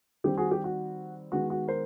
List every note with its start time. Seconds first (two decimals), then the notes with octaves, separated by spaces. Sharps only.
0.24 D#3 G3 C4 G4
0.38 F#4 G#4
0.51 G4
0.64 F#4
1.32 D#3 G#3 B3 F#4
1.50 F#4
1.68 A#4 C5